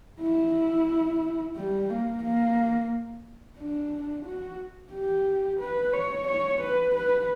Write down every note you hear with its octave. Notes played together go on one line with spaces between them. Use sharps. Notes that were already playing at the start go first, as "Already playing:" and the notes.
E4
G3
A#3
A#3
D4
F#4
G4
B4
C#5
C#5
B4
B4